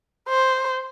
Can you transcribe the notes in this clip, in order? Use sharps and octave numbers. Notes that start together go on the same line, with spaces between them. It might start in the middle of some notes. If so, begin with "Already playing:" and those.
C5